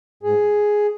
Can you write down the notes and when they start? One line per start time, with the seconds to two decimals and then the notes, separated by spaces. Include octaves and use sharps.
0.23 G#2 G#4